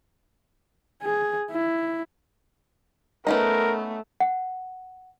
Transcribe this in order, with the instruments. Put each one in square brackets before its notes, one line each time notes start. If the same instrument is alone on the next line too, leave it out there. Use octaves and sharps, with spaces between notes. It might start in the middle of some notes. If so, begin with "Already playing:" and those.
[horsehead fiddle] G#4
E4
[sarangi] A3 [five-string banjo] B3 C#4 D#4 [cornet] A#4
[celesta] F#5